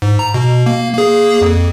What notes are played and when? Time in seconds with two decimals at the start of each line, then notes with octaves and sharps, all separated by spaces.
0.02 G#2
0.19 A#5
0.34 B2
0.66 A#3
0.94 A#3 G#4
1.41 F2